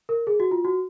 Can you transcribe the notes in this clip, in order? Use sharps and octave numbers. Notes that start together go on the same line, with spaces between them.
A#4
G#4
F#4
F4
F#4